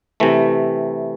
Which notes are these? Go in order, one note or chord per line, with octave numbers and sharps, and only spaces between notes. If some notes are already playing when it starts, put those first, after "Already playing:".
C3 E3 A3